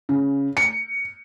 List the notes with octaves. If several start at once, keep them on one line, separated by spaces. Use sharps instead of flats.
C#3
C#7